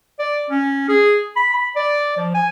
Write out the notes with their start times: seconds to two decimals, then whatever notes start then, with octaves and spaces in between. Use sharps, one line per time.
0.19 D5
0.50 C#4
0.88 G#4
1.36 B5
1.54 B5
1.76 D5
2.17 F3
2.34 G#5